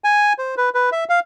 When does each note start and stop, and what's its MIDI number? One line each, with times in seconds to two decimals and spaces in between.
0.04 0.33 80
0.39 0.55 72
0.57 0.69 71
0.75 0.90 71
0.92 1.04 76
1.09 1.20 77